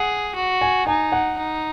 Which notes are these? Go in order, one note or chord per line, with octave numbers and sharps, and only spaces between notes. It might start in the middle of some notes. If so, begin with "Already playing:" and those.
Already playing: G#4 F#5
F#4
G#5
D#4 G#5
F#5
D#4